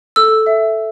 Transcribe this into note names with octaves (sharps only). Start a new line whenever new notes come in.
A4 E6
E5